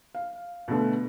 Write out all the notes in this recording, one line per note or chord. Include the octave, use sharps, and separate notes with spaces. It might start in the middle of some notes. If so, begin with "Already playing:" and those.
F5
B2 D3 A3 B3